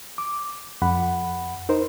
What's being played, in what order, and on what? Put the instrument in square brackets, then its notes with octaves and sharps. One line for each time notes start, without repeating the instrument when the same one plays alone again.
[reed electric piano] D6
F2 F#5 B5
D#4 A#4 C5